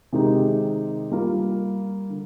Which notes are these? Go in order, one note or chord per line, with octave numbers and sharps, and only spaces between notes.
C3 D#3 G#3 D#4 G4
G3 A#3 F4 A#4
D3